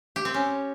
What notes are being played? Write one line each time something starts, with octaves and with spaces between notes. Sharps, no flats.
G4
C4
C#4